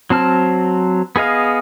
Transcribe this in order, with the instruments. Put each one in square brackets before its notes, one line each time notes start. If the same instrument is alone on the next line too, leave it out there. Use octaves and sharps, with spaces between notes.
[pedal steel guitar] F#3 C4 A5 F6
B3 G#4 D#5 F5